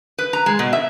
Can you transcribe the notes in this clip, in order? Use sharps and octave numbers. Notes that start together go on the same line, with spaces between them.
B4
A#5
G#3
B2
E5